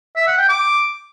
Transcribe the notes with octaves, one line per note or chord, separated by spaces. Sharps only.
E5
F#5
G5
D6